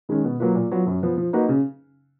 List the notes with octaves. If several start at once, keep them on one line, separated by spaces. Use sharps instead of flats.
D#3 G#3 C#4
B2
F#3 A#3 F4 B4
A#2
F#3 B3 F4
F#2
F3 B3
F3
A#3 D#4 F#4 B4
C#3